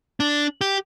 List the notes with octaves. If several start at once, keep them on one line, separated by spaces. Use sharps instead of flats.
D4
G4